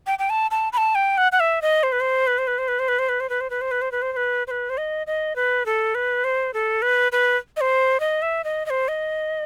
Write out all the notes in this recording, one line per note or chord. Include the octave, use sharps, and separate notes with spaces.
G5
G5
A5
A5
B5
A5
G5
F#5
F#5
E5
D#5
C5
B4
C5
B4
C5
B4
C5
B4
C5
B4
C5
B4
C5
B4
C5
B4
C5
B4
C5
B4
C5
C5
B4
C5
B4
C5
D#5
D#5
B4
A4
B4
C5
A4
B4
B4
D#5
C5
D#5
E5
D#5
D#5
C5
D#5